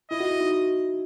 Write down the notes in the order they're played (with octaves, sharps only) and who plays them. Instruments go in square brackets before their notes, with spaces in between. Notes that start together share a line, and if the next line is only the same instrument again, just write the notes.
[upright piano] E4 [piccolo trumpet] D#5
[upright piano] F#4
E4
D#4